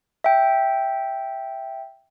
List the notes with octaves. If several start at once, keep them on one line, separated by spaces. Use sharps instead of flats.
E5 G5